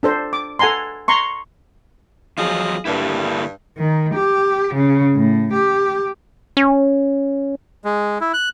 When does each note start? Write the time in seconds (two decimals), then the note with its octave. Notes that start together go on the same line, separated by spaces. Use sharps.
0.03 D4 A4 C5
0.33 D6
0.59 A4 F#5 G#5 A#5 C6
1.08 A#5 C6 C#6
2.38 E2 F3 F#3 F4 G#4 D#5
2.85 G2 D3 A#3 E4
3.78 D#3
4.15 G4
4.75 C#3
5.16 A2
5.53 G4
6.57 C#4
7.84 G#3
8.21 E4
8.34 F#6